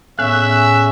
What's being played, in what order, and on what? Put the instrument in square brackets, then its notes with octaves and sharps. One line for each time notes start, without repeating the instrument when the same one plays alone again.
[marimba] A2 B3 [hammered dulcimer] C#4 G#4 [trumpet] E5 [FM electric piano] F#6